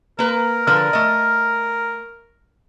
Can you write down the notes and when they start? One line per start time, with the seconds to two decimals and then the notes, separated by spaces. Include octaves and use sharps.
0.19 A#3 A#4 B4
0.67 D3 F3 B4 F6
0.93 A3 D#5